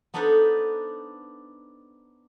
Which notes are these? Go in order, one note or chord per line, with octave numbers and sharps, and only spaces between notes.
B3 D4 D#4 A4 B4 C5